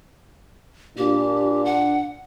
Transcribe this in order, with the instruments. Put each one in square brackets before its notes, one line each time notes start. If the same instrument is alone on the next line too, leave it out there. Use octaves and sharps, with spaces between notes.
[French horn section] A#2 D4 [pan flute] G4
[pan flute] F#5